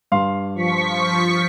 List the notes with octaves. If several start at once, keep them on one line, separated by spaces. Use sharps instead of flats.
G2 F5 C6
F3 C#6 B6